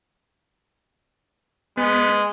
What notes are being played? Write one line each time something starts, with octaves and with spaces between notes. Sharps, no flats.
G#3 B3